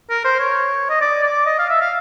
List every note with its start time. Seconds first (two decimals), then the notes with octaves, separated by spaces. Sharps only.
0.10 A#4
0.25 C5
0.40 C#5
0.89 D#5
1.01 D5
1.24 D5
1.46 D#5
1.59 F5
1.69 E5
1.81 F5